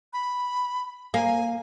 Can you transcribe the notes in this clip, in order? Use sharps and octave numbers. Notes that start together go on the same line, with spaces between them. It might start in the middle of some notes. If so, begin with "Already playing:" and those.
B5
A#3 G#5